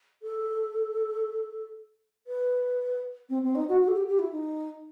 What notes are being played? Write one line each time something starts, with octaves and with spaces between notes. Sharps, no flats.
A4
B4
C4
C4
D#4
F#4
F#4
A4
G4
G4
E4
D#4